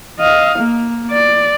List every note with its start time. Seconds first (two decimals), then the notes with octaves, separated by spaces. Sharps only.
0.19 D#5 F5
0.59 A#3
1.11 D5